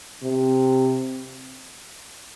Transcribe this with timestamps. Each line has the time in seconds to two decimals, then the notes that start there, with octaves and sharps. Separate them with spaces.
0.23 C3